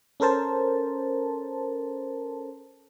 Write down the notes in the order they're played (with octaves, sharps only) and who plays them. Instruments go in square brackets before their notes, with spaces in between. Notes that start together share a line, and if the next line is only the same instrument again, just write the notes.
[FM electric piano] C#4 A4 A#4 C5 A5